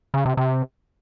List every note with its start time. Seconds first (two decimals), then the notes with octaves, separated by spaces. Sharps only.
0.14 C#3
0.26 C3
0.37 C3